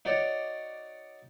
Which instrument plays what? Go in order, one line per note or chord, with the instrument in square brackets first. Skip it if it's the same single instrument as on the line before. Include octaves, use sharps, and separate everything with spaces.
[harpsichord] D#4 F#4 C#5 D5